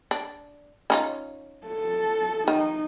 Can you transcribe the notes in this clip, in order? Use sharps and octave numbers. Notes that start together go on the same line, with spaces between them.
D4
C#4 D#4 F4
A4
D#3 D#4